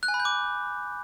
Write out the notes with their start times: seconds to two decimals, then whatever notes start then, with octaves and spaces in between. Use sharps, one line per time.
0.03 F#6
0.08 G#5
0.14 B5
0.20 G6
0.25 D6